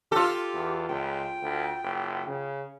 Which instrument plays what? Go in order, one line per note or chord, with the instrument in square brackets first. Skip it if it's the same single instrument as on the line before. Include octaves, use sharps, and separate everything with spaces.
[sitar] F4 A4 [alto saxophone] G4
[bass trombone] E2
[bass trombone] C#2 [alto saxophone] G5
[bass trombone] D2
F#1
C#3